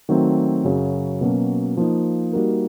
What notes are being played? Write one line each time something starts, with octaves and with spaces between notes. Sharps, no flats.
D#3 F#3 A3 C4
F#2 C#3 F#3
B2 F#3 A#3 C#4
F3 A#3 D#4
G3 A#3 D#4 F#4 A#4